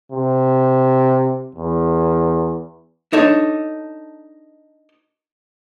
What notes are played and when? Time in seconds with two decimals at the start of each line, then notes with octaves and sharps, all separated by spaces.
0.11 C3
1.55 E2
3.12 D4 D#4 A4 C#5